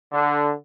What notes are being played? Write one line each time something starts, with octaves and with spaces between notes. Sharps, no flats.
D3